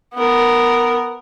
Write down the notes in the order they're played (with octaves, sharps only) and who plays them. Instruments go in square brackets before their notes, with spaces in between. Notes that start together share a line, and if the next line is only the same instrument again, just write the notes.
[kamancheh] B3 A#4